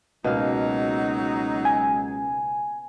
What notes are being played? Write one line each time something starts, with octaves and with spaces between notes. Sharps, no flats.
C#2 B2 F#3 A#3 D#4 F5
G#5